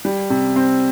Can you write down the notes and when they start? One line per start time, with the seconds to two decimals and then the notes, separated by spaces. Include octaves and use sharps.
0.05 G3
0.30 C3
0.56 C4